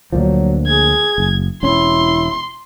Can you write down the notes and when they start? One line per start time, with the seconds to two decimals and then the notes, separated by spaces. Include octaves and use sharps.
0.12 D2 A#2 F3 F#3
0.67 G#4 G#6
1.18 F#1
1.63 E1 C#4 E4 C6